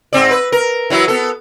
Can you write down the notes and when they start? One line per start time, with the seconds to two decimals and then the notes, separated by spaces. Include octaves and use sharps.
0.13 G#2 C4 D5
0.31 B4
0.52 A#4
0.90 E3 F#3 E4
1.08 B3 A4